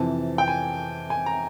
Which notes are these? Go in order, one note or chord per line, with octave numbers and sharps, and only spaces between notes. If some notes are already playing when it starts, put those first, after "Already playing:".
Already playing: F2 C3 E3 A5
G5
G#5
G#5
A#5